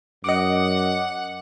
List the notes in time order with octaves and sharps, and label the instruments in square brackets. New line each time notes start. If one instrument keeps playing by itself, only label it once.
[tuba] F#2 [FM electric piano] D#5 D6 [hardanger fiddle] F#5